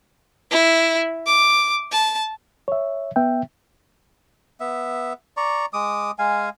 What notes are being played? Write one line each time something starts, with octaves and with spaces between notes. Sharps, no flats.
E4
D6
A5
C#5 E5
B3 E5 G5
B3 E5
D5 A#5 C#6
G#3 D6 D#6
G#3 F5 G#5